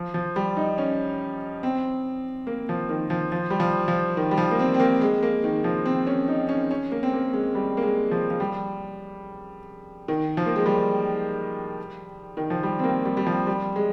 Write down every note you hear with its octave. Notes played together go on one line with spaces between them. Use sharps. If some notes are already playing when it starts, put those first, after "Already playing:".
Already playing: F3
F3
G3
D#4
C#4
C4
A#3
F3
D#3
F3
F3
G3
F3
F3
D#3
G3
F3
A#3
C4
C4
A#3
G#3
A#3
D#3
F3
C4
C#4
D#4
C#4
C#4
A#3
C4
A#3
G#3
G3
A#3
G#3
F3
F3
G3
D#3
F3
A#3
G#3
G3
D#3
F3
G3
C4
A#3
G3
G3
F3
G3
G#3